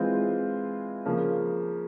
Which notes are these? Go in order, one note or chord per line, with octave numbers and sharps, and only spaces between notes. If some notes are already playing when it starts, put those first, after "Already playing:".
Already playing: E3 G#3 C4 F4
C#3 F3 A#3